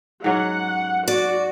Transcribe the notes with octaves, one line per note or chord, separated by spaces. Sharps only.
G#2 F#3 C#4 F#5
F#4 D5